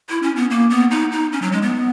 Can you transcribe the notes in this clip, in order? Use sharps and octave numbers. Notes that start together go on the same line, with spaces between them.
E4
C#4
B3
A#3
B3
D#4
D#4
C#4
F#3
G#3
B3